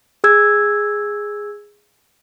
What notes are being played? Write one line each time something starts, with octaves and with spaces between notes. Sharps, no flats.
G#4 E6 G#6